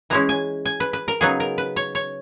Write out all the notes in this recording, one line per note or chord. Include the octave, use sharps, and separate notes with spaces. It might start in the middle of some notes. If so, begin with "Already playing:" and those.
E3 G#3 C#4 E4 A#5
G#5
G#5
B4
B4
A#4
C#3 F#3 B3 D#4 G#4
A#4
B4
C#5
C#5